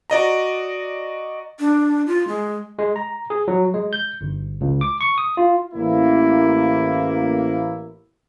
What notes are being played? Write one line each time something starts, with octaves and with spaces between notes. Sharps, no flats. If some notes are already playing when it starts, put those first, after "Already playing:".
F#4 D5 D#5 A#5
D4
F4
G#3
G#3
A#5
G#4
F#3
G#3
G6
G1
C#2
D6
C#6
D#6
F4
A1 A#3 E4